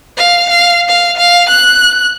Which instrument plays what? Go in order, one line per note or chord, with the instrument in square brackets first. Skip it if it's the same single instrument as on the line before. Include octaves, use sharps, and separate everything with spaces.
[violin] F5
F5
F5
F5
F#6